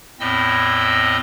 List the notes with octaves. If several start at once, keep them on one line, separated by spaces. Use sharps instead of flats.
E2 A2 C4 D#5 E6